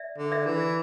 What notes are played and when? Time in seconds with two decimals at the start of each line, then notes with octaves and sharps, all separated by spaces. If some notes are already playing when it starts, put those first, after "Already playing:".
Already playing: D5 E5
0.18 D3
0.32 D5 E5
0.46 E3